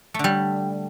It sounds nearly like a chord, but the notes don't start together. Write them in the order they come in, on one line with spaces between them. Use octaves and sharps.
A3 D3 G3